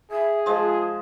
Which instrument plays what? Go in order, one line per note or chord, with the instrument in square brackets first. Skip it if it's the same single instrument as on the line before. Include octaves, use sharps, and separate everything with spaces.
[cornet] G#4 [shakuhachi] E5
[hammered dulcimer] F3 G#3 [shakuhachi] F4